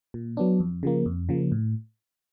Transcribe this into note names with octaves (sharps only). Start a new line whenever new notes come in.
A#2
F#3 B3 D4
F2
C#3 F3 A#3
F2
C#3 F3 A#3
A2